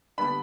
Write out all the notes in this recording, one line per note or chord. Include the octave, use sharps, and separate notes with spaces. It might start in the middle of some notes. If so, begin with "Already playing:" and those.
D3 G3 B3 D4 B5